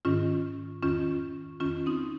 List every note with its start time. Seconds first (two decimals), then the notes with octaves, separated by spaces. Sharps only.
0.05 G#2 D#3 C#4 F4
0.83 F2 D#3 C#4 F4
1.60 F2 D#3 C#4 F4
1.86 C4 D#4